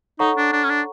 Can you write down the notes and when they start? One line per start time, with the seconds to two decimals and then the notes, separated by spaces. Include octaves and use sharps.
0.19 D#4 A4 C#5 F#5 A#5 C#6
0.37 D4
0.53 D4
0.64 C#4
0.70 D4